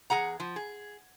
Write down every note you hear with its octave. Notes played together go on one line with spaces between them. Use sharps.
E2 G#3 G#4 F#5 A#5
F3
G#4